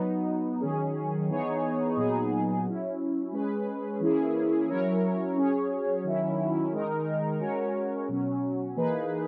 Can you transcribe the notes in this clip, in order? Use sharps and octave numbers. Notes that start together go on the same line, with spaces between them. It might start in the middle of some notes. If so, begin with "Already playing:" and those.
Already playing: F#3 B3 D#4
D#3 F#3 C#4 G#4
E3 B3 D#4 G#4 C#5
A#2 F#3 B3 D#4 G#4
F#3 C#4 E4
G#3 C#4 G#4 B4
E3 A#3 C#4 E4 G#4
F#3 C#4 E4 A#4 C#5
F#3 C#4 G#4 C#5
D#3 F#3 C#4 E4
D#3 G#3 D#4 A#4
G#3 C#4 F#4 A#4 C#5
B2 F#3 C#4
E3 A#3 D#4 G#4 B4